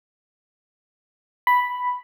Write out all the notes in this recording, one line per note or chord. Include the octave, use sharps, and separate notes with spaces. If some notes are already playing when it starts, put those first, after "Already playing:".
B5